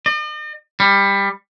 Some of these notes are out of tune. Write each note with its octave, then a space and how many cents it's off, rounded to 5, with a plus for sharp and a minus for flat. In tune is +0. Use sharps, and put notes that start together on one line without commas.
D#5 -45
G3 +15